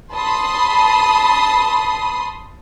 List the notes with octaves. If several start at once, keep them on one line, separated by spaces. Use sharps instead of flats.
A5 B5 C6 D#6